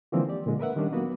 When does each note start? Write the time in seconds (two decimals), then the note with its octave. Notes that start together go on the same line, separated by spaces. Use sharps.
0.12 D3 E3 F3 G#3 A#3 C4
0.28 G4 D5
0.46 A#2 D3 G#3
0.59 A#4 B4 E5 F#5
0.76 D#3 G3 C#4 D4
0.92 F#3 A#3 B3 F#4 B4